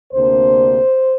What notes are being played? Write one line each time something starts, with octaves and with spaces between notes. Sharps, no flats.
D2 C3 A#3 D4 C5